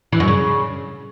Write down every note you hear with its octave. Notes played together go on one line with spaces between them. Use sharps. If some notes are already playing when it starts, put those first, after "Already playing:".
E3
F#2
C#3